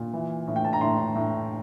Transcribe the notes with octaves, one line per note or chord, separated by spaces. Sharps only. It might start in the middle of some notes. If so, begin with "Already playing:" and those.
Already playing: A#2
E3
A2
G5
A5
A#5
A2 C6
A2